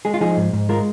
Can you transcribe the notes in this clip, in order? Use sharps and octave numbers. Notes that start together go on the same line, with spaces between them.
G#3 G#4
F4
F3 D#4 G#4
G#2
G#2
G#3 F4 A#4